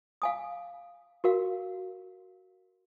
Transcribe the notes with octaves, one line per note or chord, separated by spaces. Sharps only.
F5 G#5 D#6
F#4 A#4 F5